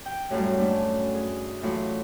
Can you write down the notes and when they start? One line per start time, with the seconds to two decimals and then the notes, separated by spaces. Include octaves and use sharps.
0.06 G5
0.30 F#2 A2 F#3 G3
0.58 A3 C#4 D4
1.15 G#4
1.63 A2 E3 F#3 F4 F#4